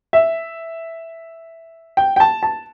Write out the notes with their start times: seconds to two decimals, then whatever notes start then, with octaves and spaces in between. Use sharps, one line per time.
0.13 E5
1.97 G5
2.16 G5
2.20 A5
2.43 A5